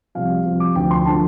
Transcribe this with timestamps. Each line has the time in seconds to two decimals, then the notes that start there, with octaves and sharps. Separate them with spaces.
0.15 C2 C3 F3 F5
0.45 C2 C3 F3
0.60 D6
0.76 D2 D3 F3 G5
0.91 C6
1.06 D3 F3 A5